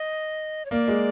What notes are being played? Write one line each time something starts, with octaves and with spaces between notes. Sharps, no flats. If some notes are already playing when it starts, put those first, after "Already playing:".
Already playing: D#5
C#5
A#3 D5
G#3